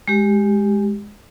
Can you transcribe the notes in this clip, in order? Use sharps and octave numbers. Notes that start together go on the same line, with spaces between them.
G#3 G4